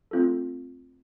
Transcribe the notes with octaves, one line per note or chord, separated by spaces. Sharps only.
A3 C4 F4 A4